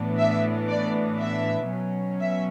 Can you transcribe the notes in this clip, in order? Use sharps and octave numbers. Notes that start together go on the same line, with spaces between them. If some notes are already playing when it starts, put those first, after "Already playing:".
Already playing: A2 E3 B3 D4
E5
D5
E5
B2 F#3 C#4
E5